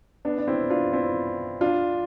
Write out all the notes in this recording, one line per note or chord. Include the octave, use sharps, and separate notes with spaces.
B3 D4
D4
C4 E4
D4 F4
C4 E4
D4 F4